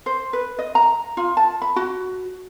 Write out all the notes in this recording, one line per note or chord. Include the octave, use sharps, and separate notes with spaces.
C5
B4
D#5
A#5
F4
A5
B5
F#4